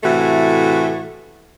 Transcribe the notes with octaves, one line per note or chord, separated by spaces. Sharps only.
A2 C3 E3 A3 F#4